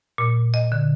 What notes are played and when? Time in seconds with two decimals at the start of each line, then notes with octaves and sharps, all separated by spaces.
0.18 A#2
0.54 D#5
0.72 D3